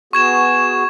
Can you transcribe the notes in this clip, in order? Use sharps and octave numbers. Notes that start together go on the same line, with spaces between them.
B3 F#4 G#4 C#6 G#6 E7